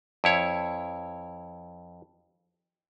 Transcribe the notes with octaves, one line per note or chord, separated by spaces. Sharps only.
F2 E4 C#5